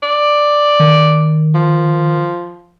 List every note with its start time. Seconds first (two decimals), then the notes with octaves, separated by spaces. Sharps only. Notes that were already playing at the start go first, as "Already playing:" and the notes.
0.03 D5
0.79 D#3
1.55 F3